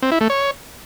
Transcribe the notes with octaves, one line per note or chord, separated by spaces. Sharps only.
C4
E4
A3
C#5